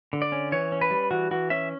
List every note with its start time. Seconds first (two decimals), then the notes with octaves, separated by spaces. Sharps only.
0.13 D3
0.22 D5
0.32 C#4
0.52 E3 C#5
0.72 C#4
0.81 B4
0.91 G3
1.11 E3 F#4
1.31 E3 F#4
1.50 C#4 E5